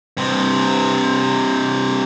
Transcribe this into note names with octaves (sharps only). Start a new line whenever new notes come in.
G2 C3